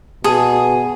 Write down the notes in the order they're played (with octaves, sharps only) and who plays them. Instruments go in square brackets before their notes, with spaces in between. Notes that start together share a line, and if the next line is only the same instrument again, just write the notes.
[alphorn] B2 [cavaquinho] G#4 [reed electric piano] G#5 A5 D#6